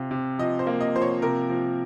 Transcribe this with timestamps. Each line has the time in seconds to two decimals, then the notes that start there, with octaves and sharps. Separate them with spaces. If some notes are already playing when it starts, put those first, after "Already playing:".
Already playing: C3 F4
0.11 C3
0.39 F3 D#5
0.59 C5
0.67 A#3
0.81 D#5
0.95 F3 C5
1.02 C#5
1.22 C3 A#4
1.50 F3